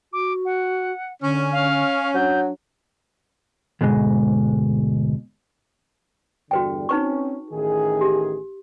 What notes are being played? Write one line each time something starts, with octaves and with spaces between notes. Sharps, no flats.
F#4 D6
F#5
D3 C#4
F5
F#3 D4 G6
D2 G#2 B2 G#3
E2 G2 D3 F#4 B4 G5
C4 C#4 D#4 B4 C#6
A1 D#3 G#4
G4